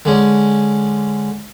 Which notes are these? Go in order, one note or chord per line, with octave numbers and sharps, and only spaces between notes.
D3 G#3 C#4